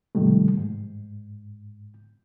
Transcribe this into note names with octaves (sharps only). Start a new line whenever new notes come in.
G#2 C3 D#3 F3 G3 A3
G#2